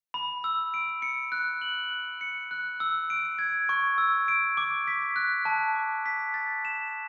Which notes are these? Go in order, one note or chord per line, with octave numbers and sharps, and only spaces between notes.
B5
E6
D7
C#7
F#6
F#7
F#6
C#7
F#6
E6
D7
G#6
C#6
E6
D7
D6
B6
F#6
A5
D6
B6
A6
E7